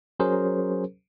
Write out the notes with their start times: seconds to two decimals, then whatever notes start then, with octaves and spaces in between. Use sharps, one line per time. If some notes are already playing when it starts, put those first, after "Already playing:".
0.20 F#3 C#4 G#4 A#4 C5